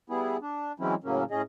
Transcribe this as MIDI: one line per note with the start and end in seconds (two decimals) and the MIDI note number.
0.10 0.37 55
0.10 0.37 59
0.10 0.37 64
0.10 0.37 68
0.42 0.72 62
0.80 0.95 52
0.80 0.95 54
0.80 0.95 56
0.80 0.95 60
0.80 0.95 61
0.80 0.95 64
1.04 1.24 45
1.04 1.24 49
1.04 1.24 54
1.04 1.24 58
1.04 1.24 61
1.31 1.42 45
1.31 1.42 61
1.31 1.42 68
1.31 1.42 75